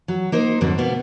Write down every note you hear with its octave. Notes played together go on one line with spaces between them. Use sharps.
F#3
A#3 D#4 C5
F2 G#2 D3 F#3
B2 A#3 B3